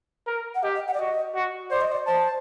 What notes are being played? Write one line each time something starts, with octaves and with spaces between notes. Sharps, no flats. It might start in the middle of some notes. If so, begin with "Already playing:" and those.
A#4
F#5
G4 D#5
D#5
F#5
D5
F#4 D#5
F#4
C5 D5
D#5
D5
C5 A5